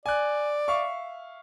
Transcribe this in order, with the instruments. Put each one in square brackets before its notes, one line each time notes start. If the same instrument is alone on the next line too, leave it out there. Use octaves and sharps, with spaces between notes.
[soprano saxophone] D5 [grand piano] G#5 F#6
[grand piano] E5 F5 C#6